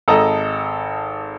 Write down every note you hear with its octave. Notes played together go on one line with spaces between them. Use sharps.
G#1 A4 D#5 A#5